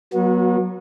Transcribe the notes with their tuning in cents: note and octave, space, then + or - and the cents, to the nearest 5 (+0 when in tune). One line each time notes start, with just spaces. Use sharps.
F#3 +0 B3 -45 F#4 -30